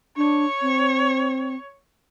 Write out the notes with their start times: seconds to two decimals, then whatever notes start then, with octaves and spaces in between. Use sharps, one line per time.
0.17 D4 C#5
0.62 C4